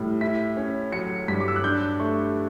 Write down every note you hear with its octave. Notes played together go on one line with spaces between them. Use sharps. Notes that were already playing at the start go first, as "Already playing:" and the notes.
Already playing: A2 G3
E4 B6
C#4
F#3 C#7
G2 B6
D6
E6
F#6
D4 G6
A3 C#6